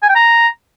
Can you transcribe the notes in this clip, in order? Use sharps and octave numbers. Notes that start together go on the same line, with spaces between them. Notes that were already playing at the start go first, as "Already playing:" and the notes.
G#5
G5
A#5